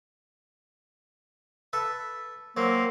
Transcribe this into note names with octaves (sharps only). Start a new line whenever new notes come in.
A4 B4 E5
F#3 A#3 C4